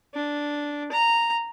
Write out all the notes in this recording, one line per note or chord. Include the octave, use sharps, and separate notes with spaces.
D4
A#5